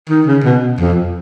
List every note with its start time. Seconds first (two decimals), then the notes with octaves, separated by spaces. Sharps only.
0.09 D#3
0.26 C#3
0.44 B2
0.80 F2